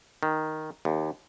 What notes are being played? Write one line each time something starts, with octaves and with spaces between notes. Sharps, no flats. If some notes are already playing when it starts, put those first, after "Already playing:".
D#3
D#2